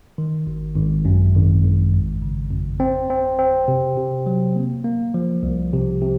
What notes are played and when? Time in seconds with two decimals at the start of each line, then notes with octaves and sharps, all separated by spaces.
0.18 D#3
0.47 G#1
0.76 G#1
1.05 F#2
1.34 G#1
1.63 G#1
1.93 F2
2.22 C#3
2.51 F2
2.80 C4
3.10 C4
3.39 C4
3.68 C3
3.97 C3
4.26 F#3
4.56 A#3
4.84 A#3
5.14 F3
5.43 C2
5.73 C3
6.02 C3